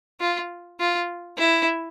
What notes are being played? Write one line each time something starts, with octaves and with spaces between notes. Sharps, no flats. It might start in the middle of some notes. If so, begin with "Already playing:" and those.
F4
F4
E4